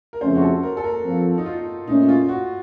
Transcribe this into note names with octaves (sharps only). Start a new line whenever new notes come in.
A#4
F2 C#3 A3 C#4 C5
F#4
A4
A#4
A4
A#4
F3 C4 F4 A4
D#4
F4
A#2 A3 C#4 D#4
F4
F#4